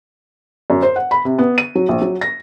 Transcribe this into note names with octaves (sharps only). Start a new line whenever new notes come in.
F#2
C5
F#5
B5
C3
B3
D#7
F#3
A#1
F#3
A#6